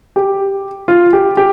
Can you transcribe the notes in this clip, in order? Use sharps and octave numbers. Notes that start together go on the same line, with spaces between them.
G4
F4
G4
G4